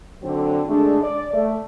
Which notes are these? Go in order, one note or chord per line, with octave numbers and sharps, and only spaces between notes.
D3 F#3 C4
D3 G#3 A3 D4
D5
A3